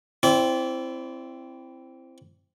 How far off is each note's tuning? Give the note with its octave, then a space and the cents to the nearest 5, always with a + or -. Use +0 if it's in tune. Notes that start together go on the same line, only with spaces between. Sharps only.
C4 +0 E4 +15 D5 -30